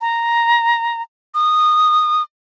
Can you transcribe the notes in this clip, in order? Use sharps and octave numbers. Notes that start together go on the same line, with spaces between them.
A#5
D#6